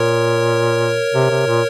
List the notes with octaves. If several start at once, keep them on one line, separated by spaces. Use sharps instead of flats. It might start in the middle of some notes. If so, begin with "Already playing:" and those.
Already playing: A#2 A#4 C#5
C3
C3
A#2